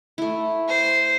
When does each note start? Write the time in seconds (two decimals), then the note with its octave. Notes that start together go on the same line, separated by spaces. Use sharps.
0.18 A3 E4
0.68 C5